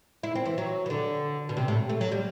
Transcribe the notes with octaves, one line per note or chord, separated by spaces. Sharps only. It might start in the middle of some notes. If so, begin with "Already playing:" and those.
E4
C4
E3
F#3
E3
D3
B2
C3
A2
A3
F#3
G3